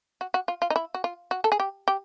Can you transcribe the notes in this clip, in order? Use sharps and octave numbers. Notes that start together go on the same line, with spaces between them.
F#4
F#4
F4
F4
D#4
E4
F#4
F4
F#4
A4
G#4
G4
G4